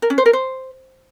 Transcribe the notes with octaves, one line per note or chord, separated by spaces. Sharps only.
A#4
C#4
C5
A#4
C5